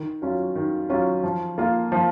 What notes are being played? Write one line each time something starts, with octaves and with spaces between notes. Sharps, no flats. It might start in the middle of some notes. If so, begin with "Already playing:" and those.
Already playing: D#3
F#3 C#4 F4
D#3
F#3 C#4 F4
F3
A#3 F4
F3